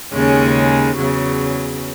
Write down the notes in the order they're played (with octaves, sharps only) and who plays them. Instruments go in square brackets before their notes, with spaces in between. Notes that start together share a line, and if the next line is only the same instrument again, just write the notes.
[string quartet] D#2 C#3 G#3 C#4
E2 C#3 F#3